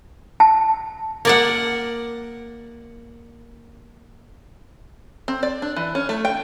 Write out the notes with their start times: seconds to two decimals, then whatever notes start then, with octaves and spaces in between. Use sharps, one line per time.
0.40 A5
1.25 A#3 D5 F#5
5.28 C4
5.43 D5
5.62 D4
5.76 E3
5.95 C#4
6.09 A3
6.25 G5